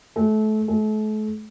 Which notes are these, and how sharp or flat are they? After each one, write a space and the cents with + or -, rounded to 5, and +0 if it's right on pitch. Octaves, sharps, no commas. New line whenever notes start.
A3 -30
A3 -40